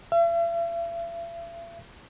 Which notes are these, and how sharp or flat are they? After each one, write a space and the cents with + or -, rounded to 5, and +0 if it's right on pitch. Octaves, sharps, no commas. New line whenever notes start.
E5 +45